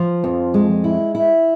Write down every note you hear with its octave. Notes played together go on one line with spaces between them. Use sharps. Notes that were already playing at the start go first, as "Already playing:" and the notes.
Already playing: F3
F2
G#3
E4
E4